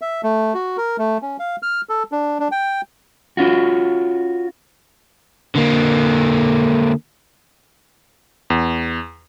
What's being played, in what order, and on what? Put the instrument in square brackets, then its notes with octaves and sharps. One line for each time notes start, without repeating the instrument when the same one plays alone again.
[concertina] E5
A3
F#4
A#4
A3
C#4
F5
F6
A4
D4
D4
G5
[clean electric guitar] C#4 F4 F#4
[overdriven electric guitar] D3 A#3
[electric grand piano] E2